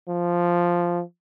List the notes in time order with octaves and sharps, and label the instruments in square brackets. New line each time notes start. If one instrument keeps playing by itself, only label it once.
[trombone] F3